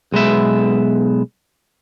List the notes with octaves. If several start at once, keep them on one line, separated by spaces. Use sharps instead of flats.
B1 G#3 B3 E5